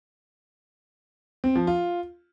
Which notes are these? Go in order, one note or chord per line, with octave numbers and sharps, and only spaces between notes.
C4
F3
F4